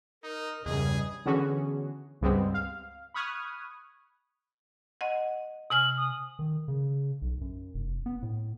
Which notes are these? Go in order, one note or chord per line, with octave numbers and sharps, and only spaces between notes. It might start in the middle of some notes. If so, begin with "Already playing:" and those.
D#4 A#4
E2 G2 C#3 G3 G#4 D#5
D3 E3 B3 C#4 F#4 G#4
C#2 G2 G3 G#3 B3 C4
F5
B5 C#6 D#6 F6 F#6 G#6
D#5 F#5
C3 G#5 F6 F#7
D#6
D#3
C#3
B1
F#2
F1
B3
A2